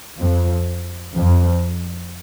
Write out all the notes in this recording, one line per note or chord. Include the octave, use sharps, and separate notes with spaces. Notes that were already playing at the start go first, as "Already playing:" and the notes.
F2
F2